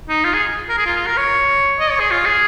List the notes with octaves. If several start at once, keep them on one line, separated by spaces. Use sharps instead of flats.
D#4
F4
G#4
A#4
G#4
F4
F4
A#4
C#5
D#5
C#5
G#4
F4
G#4